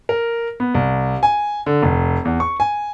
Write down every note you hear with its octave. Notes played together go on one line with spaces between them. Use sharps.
A#4
B3
C2
G#5
D3
F1
E2
C#6
G#5